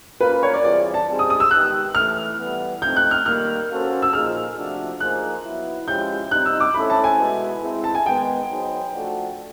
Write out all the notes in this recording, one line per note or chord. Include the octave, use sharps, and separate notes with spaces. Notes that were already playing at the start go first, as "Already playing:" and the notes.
A#3 C#4 F4 A#4 B4
C#5
D5
E3 G3 C4 F4 G#4 D5
A5
G3 C4 D#4 G#4 C5
D#6
D#6
E6
D#3 G#3 B3 D#4 G4 F#6
A2 E3 A3 F6
E3 G3 B3
F3 A3 C4 D#4 G6
F#6
F6
D#3 G3 A#3 F6
A#3 C#4 F#4 A4 C5
E6
A#2 F3 A#3 D#4 G#4 F6
C3 F3 A3 D4 F#4
F3 A#3 D#4 G#4 C5 F#6
F#3 B3 E4
F3 G#3 C#4 E4 G4 G6
G3 C4 D#4 F#6
E6
D6
A3 C#4 E4 A4 C5 B5
A5
G#5
B2 G#3 B3 E4 A4
G#3 C4 E4
A5
G#5
D#3 G#3 B3 D#4 G#4 G5
F#3 B3 D#4 G#4 C5
F3 A3 D4 F#4 A4